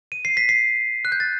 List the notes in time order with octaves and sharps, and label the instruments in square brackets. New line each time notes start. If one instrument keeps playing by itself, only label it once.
[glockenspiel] D#7
C7
B6
C7
F#6
G6
A6